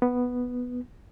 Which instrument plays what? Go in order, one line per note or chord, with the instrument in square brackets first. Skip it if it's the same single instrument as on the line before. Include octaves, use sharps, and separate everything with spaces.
[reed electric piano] B3